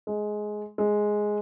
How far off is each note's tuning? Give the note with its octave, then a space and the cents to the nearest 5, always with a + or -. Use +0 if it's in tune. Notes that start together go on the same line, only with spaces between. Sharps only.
G#3 +15
G#3 +5